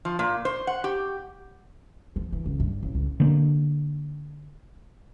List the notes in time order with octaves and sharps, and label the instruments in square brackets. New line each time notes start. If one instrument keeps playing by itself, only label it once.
[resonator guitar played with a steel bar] F3
A#2
C5
F#5
G4
[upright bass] F3
E3
C#2
G2
A1
C#2
[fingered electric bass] D3 A#3